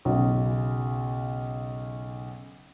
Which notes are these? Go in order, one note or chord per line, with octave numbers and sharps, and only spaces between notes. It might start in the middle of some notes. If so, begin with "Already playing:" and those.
B1 C#3